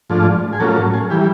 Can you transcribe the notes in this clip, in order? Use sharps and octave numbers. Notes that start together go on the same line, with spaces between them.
G#2 F3 A3 D4 F4
G#4
A2 F#3 A#3 C#4 F4 A4
A4
G#4
E3 G3 G4